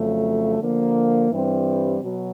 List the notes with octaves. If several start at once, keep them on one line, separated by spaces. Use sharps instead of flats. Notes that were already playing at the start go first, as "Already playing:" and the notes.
Already playing: F2 C#3 F#3 A3
D3 F3 A#3
G2 E3 G3 C4
B2 F#3